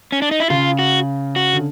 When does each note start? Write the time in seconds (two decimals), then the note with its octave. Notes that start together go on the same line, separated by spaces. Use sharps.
0.12 C#4
0.22 D4
0.31 D#4
0.40 E4
0.50 C#3 F4
0.79 F#4
1.36 F#4
1.53 D3